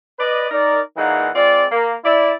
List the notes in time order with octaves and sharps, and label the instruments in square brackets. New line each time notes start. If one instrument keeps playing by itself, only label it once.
[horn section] B4 D5 D#5
D#4 A#4 D5
A#2 E3 G#3 A#3 D#4 F#5
G#3 C4 F4 D5
A#3
E4 D5